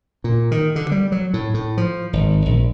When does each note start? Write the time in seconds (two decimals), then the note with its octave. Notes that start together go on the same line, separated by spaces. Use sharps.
0.24 A#2
0.51 D#3
0.76 D3
0.91 G3
1.12 F#3
1.34 A2
1.54 A2
1.77 F3
2.13 G#1
2.46 A#1